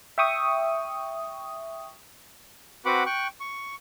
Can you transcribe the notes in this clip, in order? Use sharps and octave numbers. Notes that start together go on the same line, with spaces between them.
E5 G5 C#6 D#6
C4 F#4 B4 F#5 B5 D6
G5 C#6 F#6
C#6